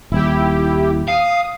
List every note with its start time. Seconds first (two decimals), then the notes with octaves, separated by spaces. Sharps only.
0.12 D#1 E4 G4
1.08 F5 D#6